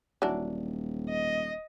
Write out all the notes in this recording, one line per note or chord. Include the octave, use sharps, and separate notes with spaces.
D#1 E3 F#3 D4
D#5